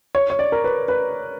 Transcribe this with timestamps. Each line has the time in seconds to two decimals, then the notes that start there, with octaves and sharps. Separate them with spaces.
0.15 C#5
0.30 C#5
0.39 D5
0.52 A#4
0.64 B4
0.88 B4